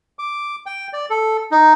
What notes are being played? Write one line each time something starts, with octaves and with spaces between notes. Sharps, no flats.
D6
G5
D5
A4
D#4